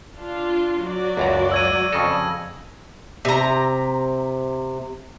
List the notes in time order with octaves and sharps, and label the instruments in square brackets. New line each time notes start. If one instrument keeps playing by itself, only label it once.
[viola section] D4 F4
F#3 F#4 D5
[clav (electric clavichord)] C#2 F#2 A#5
[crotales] E6 G#6 D#7
[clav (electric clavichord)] F2 C#3 A4 [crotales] A#6
[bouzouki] C3 A#5